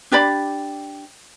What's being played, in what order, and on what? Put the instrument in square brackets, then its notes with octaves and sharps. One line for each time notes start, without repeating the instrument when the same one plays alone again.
[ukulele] D4 G4 D5 B5